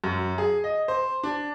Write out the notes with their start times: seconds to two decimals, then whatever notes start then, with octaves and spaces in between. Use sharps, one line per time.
0.04 F#2
0.38 G#4
0.64 D#5
0.88 C5
1.23 D4